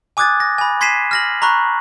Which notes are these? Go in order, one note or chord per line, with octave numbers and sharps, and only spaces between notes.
G#5 D6 D#6 F#6 G#6 A6
A#6
G#5 B5
C6 G#6 B6 C7 D#7 E7
F6 A#6 F#7
A#5 B5 C#6 F#6